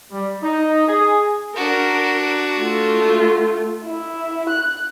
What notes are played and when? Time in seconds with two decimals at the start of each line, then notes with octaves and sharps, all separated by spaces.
0.11 G3
0.43 D#4
0.88 G#4
1.56 D4 F#4 A#4
2.60 A3 F4
3.84 E4
4.49 F#6